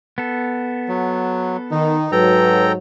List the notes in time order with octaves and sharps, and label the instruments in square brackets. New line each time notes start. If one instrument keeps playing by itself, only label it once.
[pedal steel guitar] B3 A4
[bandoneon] F#3
[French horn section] D#3 [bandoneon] D#4
[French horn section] G#2 F#3 [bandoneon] A4 G5 A#5 [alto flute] B4